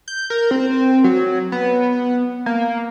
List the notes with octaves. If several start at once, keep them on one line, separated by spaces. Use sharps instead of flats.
G6
A#4
C4
F#3
B3
A#3